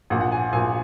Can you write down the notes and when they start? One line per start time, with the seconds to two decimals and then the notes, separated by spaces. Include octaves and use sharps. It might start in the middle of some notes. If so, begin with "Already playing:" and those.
0.10 A#1 A#2 F#5
0.21 F#5
0.32 G#5
0.52 A#1 A#2 G#5